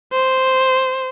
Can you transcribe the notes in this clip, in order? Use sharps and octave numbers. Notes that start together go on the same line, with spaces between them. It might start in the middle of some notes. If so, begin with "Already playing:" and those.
C5